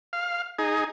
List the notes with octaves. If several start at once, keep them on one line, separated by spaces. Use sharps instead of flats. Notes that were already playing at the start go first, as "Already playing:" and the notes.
F5
D#4 G#4